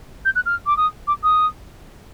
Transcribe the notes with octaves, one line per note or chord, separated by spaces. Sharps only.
G6
F#6
F6
D6
D#6
D6
D#6